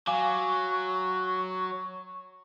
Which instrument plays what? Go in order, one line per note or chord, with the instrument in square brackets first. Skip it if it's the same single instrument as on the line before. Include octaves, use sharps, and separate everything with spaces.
[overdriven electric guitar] F#3 [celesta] F5 G#5 D6 [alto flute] C#6